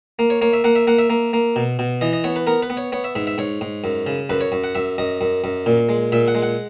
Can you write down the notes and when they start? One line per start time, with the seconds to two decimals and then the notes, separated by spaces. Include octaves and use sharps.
0.19 A#3
0.30 C#5
0.42 A#3 C#5
0.53 E5
0.64 A#3 F#5
0.76 E5
0.87 A#3 F#5
0.99 E5
1.10 A#3
1.33 A#3
1.56 B2
1.79 B2
2.01 E3 D#5
2.13 D#5
2.24 B3 C#5
2.36 B4
2.47 B3 A#4
2.63 B4
2.70 B3
2.77 C#5
2.92 B3 C#5
3.04 E5
3.15 G#2 E5
3.27 E5
3.38 G#2 C#5
3.61 G#2
3.84 F#2
4.07 C#3
4.30 F#2 B4
4.41 C#5
4.52 F#2
4.64 F#5
4.75 F#2 E5
4.98 F#2 D#5
5.21 F#2
5.44 F#2
5.66 A#2
5.89 G#3
6.12 A#2 E5
6.28 F#5
6.35 G#3
6.43 F#5